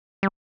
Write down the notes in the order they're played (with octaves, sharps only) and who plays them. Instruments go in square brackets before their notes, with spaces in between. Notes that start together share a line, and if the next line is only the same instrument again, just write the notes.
[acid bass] G3